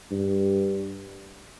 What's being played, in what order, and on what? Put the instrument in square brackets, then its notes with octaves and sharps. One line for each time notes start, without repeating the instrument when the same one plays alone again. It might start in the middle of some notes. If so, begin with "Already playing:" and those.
[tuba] G2